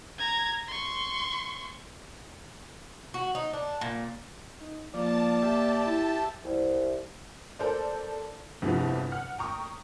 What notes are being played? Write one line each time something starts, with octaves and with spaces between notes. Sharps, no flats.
A#5 G#6
C6 C#6
F#4
D#4
D4
A#2
D#4
F3 A#3 D5 A5
G4 E5
E4
C2
A4 A#4 C5 D5
G1 E2 G2 C3 F3
F#5 F6
G5 A#5 C#6 D#6